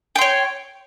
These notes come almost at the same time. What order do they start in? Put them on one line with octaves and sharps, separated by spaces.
G5 C6 C#5